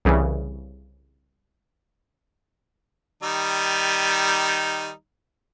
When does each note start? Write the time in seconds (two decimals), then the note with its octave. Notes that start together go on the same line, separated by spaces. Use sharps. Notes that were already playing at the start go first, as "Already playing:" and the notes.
0.05 C2 C#3 E3
3.23 D#3 G3 D#4